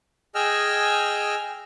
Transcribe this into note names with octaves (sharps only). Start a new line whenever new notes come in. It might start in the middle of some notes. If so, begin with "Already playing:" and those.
G#4 D#5 G5 G#5 E6 F6